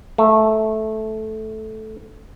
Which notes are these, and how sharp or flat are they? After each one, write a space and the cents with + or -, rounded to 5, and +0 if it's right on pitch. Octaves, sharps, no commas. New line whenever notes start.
A3 -10